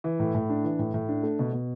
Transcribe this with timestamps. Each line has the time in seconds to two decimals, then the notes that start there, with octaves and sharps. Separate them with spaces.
0.04 E3
0.20 A2
0.35 A2
0.50 D4
0.64 E3
0.79 A2
0.94 A2
1.09 D4
1.23 A3
1.39 B2
1.53 B2